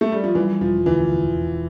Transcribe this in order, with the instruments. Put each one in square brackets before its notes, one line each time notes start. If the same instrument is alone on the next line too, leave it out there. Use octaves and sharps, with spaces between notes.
[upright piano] A3
G3
F3
[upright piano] E3 [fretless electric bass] G3
[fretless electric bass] E1 [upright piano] F3
[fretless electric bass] D2 [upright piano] E3
[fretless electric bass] E1
E1